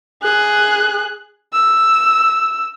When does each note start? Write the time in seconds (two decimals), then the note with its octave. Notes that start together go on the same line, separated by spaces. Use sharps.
0.23 G#4 F#6
1.53 E6